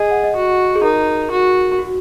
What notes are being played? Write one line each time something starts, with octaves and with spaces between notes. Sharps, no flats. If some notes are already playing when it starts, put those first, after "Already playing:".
Already playing: G#4 D#5
F#5
D#5
F#4
G#4
D#4 A#4
F#4
F#4